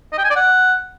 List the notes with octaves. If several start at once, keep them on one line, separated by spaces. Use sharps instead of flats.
D#5
G5
G#5
D5
F#5